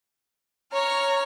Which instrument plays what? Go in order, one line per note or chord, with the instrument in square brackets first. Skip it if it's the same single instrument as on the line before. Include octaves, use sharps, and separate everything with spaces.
[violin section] C#5 [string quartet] A#5 F6